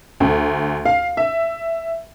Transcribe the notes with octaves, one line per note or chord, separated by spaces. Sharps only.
D2
F5
E5